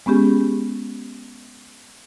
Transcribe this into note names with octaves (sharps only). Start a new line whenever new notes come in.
G#3 B3 C#4 G4 G#4